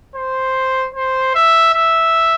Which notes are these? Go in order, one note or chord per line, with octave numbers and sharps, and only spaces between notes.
C5
C5
E5
E5